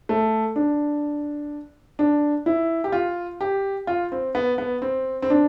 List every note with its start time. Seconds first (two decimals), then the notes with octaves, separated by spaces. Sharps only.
0.09 A3
0.56 D4
1.99 D4
2.46 E4
2.84 G4
2.92 F4
3.41 G4
3.87 F4
4.12 C4
4.35 B3
4.58 B3
4.82 C4
5.22 C4
5.30 D4